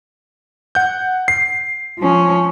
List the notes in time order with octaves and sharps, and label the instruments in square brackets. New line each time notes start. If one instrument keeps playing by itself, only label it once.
[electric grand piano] F#5 G6
C7
[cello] F3 C#4